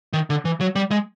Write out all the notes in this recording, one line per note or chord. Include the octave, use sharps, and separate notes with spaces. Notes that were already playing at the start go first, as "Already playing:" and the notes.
D#3
D3
E3
F#3
G3
G#3